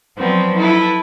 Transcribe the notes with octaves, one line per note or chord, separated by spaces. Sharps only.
F3 F#3 B3 C4 D5
E4 A4 B4